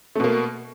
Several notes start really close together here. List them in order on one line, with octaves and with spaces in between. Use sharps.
A3 B2 A#3